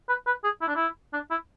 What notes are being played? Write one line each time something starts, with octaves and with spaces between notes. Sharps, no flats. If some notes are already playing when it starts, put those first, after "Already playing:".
B4
B4
G#4
E4
D4
E4
D4
E4